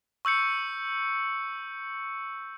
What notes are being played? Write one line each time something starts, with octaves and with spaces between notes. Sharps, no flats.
C#6 E6 G6 C#7